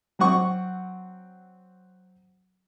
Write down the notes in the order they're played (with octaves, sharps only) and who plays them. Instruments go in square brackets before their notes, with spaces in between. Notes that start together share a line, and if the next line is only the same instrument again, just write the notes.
[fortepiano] F#3 C4 F#5 C#6